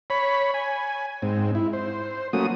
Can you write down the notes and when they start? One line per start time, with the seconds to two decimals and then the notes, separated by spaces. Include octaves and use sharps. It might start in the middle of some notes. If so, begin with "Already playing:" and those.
0.10 C#5 B5
0.54 G#5
1.22 G#2 C4
1.55 E4
1.73 C5
2.33 F#3 A3 A#3 C#4 F#4 D#6